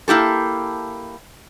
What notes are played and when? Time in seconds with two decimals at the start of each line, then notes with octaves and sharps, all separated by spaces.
0.08 A#3 E4 G4 A4